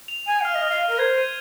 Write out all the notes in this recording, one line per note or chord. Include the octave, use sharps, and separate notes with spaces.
F7
G#5 D#7
F5 F6
D#5
F6
F5
F6
A#4
C5 G#6
D#7